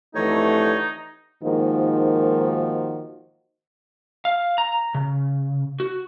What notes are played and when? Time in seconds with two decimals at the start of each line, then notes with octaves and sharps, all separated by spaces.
0.15 F2 D3 E3 A3 D#4 G4 B4 C#5
1.42 G#2 D#3 F3 A#3 D#4 F#4
4.25 F5
4.58 A#5
4.95 C#3
5.80 F#4